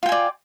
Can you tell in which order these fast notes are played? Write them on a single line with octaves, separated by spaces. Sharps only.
F4 G5 G#5 D5